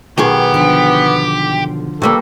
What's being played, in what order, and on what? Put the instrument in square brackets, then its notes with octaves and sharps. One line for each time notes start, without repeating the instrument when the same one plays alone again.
[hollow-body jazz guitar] B1 D#3 G#4 [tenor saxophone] B3 [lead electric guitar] G4
[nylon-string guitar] D3 F3
[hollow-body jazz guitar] G2 G3 A#3 [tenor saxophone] A4